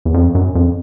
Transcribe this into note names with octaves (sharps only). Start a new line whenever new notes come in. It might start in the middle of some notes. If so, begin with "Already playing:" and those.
E2
F2
F#2
F2